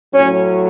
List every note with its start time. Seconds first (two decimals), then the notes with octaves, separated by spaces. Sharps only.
0.13 A2 F#3 C#4 C#5